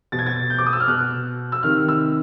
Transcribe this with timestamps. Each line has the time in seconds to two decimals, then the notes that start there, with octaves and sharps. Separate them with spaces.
0.12 B2 A6
0.19 G#6
0.26 A6
0.50 G6
0.58 D6
0.66 D#6
0.73 E6
0.80 F6
0.88 B2 F#6
1.52 E6
1.63 C3 D#3 F6
1.88 E6